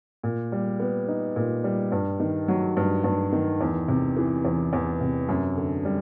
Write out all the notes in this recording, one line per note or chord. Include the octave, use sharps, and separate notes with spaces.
A#2
G3
B3
D#4
A#2
G3
G2
D#3
F#3
G2
G2
D#3
E2
C3
E3
E2
E2
C3
F#2
D3
G3